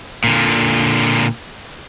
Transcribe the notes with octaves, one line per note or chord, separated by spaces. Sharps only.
A#2 D3